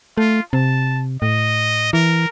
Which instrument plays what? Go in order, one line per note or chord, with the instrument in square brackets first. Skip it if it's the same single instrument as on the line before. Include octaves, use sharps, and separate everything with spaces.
[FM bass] A3 [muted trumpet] F4
[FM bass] C3 [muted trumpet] A5
[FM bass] A2 [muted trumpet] D#5
[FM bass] E3 [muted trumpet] A#4